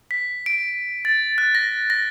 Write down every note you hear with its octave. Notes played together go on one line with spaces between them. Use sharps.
B6
D7
A6
F#6
A#6
A#6